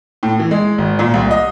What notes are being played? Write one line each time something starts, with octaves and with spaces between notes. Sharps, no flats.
A2
E3
G#3
G#1
A#2
C2
D#5